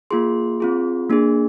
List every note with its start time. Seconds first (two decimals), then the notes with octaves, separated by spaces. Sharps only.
0.11 A#3 F4 G#4 C6
0.60 C4 F4 G#4
1.10 A#3 D4 G#4